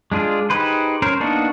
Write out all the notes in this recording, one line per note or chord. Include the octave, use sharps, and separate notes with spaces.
G#3 D4 F4 G#4
D#4 G4 G#4 B4 C5
C#4 A#4 C5
A#3 B3 D4 D#4 F#4